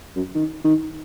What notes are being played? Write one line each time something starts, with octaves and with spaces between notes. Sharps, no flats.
F#2
D#3
D#3